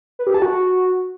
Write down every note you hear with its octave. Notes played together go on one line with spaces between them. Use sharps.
B4
G4
A5
F#4